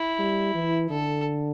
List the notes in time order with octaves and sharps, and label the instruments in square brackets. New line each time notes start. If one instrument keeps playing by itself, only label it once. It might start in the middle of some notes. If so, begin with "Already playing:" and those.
Already playing: [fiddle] E4
[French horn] G3
E3
[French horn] D3 [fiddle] A4